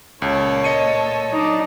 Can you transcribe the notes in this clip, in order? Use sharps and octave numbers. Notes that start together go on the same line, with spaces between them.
C#2 A#2 A4 C#5
D#5 C#7 D#7
F#3 D4 D#4